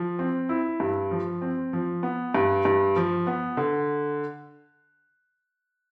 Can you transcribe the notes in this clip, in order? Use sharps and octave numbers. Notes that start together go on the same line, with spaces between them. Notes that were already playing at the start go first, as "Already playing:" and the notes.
Already playing: F3
C4
E4
G2
F3
C4
F3
B3
G2
G2
F3
B3
D3